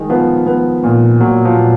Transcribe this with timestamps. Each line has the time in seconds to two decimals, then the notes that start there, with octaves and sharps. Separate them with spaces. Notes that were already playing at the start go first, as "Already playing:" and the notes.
Already playing: D#3 G#3
0.10 F3 B3
0.46 B3
0.84 A#2
1.20 A#2 F#3
1.45 F3
1.57 A#2